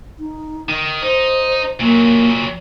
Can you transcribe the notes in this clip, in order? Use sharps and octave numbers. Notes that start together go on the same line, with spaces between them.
D#4
D#3
D#4 C5
A#2 F#3 A#3